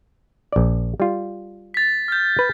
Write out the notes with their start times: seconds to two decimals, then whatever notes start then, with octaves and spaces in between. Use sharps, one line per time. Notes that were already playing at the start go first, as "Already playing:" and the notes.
0.52 A#1 D5
1.00 G3 F4
1.74 A6 B6
2.08 F6 G6
2.39 B4